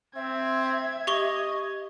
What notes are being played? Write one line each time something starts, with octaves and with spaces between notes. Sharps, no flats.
C4 E5 G#6
G4 D#5 C#6 G7